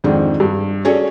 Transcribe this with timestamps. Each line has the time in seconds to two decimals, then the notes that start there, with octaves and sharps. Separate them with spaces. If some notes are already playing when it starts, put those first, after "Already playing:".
0.04 F2 G#2 D#3 C4 D4
0.40 G2
0.85 C#4 F#4 G#4 A4 C#5 D5